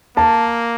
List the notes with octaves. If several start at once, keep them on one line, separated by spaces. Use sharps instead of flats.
A#3 A5